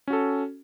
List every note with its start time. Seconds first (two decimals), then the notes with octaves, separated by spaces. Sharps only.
0.08 C#4
0.10 F#4
0.13 A4